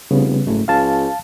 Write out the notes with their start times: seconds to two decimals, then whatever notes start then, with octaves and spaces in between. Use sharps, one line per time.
0.11 F1 C#3 G3 B3
0.46 F#1 G#2 A3
0.68 C#2 F5 A5